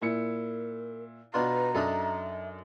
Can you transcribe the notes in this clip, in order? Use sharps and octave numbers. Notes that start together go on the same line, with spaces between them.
A#2 E4 A#4 C#7
B2 D4 F4 B4 A#5
F#2 D4 D#4 A4 E5